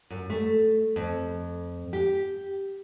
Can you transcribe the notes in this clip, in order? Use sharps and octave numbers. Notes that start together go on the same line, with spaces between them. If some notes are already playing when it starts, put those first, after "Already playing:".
F#2
A3
F2
G4